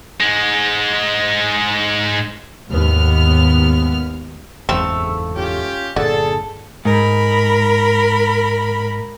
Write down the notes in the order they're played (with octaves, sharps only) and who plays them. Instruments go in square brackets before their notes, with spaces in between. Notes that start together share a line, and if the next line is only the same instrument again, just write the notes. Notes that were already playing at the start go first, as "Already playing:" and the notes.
[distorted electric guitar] G#2 G#3
[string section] D#2 G#2 B3 F6
[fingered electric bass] F#1 E2 G#2 [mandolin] A3 F5 E6 [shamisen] C4
[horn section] C#4 F4 G4
[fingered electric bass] G1 A#2 [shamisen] D3 [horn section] G#4 A4 [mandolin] A5
[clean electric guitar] G#2 [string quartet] A#4 B5